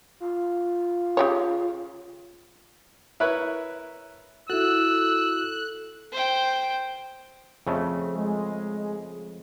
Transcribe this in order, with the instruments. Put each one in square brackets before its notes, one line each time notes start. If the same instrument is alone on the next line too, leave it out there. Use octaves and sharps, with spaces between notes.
[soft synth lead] F4
[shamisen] C#3 G4 C#5
[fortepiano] E4 A#4 B4 C#5 F#6
[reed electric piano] E4 F#4 [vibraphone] A4 [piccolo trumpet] E6 [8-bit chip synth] F#6
[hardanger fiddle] C5 G5
[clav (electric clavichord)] F2 C#3 A3
[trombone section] G#3